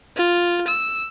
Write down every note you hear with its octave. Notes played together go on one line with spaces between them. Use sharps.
F4
E6